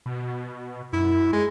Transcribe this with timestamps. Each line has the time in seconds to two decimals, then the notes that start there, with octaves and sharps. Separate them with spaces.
0.06 B2
0.93 F#2 E4
1.32 G#3